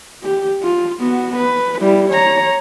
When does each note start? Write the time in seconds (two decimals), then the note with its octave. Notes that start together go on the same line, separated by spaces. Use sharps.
0.23 G4
0.62 F4
1.00 B3 F#4
1.36 B4
1.81 G3 E4
2.10 C#5 A#5